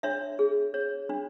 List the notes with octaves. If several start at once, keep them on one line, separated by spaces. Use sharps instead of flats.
D4 C#5 E5
G#4
C#5
D4